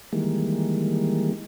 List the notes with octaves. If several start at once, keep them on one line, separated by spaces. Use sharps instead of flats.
D#3 E3 G3 G#3 A#3